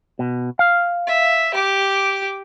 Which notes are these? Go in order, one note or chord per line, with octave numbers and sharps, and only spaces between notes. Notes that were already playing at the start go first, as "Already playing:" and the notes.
B2
F5
E5
G4 D6